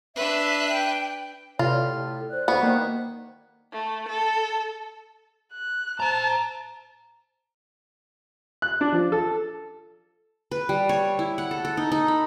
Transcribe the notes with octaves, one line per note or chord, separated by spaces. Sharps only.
D4 B4 E5
G5
A2 C3 F4 B4 C#5 D5
A4
C5 D5 F#6
D2 B3 C#6
D#3 A#3
A3
A4
F#6
C5 A5 A#5
F#6
D4
F3
A4
B4
G3
C#5
E4
F#5
A4
A4
D#4
D#4
B5